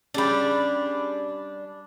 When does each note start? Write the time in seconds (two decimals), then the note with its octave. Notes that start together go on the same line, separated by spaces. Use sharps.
0.14 G3 C#4 D4 G#4 B5